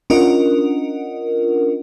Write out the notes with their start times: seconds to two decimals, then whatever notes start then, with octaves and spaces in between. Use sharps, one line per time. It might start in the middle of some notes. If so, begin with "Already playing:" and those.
0.10 C#4 D4 F4 A#4 D#5 F#5